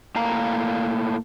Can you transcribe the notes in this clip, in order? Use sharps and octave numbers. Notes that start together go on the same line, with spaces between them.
A2 A#3 F5 A#5